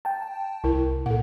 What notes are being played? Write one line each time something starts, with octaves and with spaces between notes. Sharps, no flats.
G5 A5
C2 E4 A#4
A#2 A4 F#5